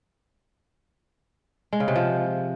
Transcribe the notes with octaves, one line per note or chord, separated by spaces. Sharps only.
G#3
C#3
C3
F3